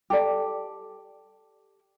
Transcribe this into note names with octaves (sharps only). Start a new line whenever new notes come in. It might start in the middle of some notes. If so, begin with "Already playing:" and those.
G4 A4 D5